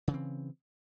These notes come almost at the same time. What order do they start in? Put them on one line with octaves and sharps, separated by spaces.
C#3 E3 C4